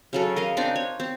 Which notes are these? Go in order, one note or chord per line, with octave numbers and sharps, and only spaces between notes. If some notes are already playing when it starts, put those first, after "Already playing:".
C#3 F#3 A4
A#4 D#5 F5
C4 D4 D#4 D5
C#5
C4